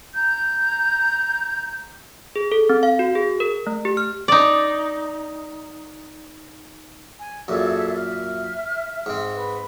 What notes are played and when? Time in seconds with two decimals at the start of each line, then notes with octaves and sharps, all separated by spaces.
0.15 A#5 G6
2.36 G#4
2.52 A4
2.69 C4
2.83 F5
2.99 F#4
3.15 G#4
3.40 A#4
3.67 A3
3.85 G4
3.97 F6
4.28 D#4 D5
7.20 G#5
7.48 F#2 A#2 G#4 A4 E5
7.97 E5 F6
9.06 G#2 C4
9.35 B4